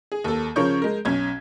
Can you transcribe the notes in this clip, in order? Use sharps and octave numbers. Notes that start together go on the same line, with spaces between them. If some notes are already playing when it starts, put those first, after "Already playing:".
G#4
D#2 A4
C#3 F3 A#4 C#5 C#6 G6
G#3 A#4
B1 C#4 G#6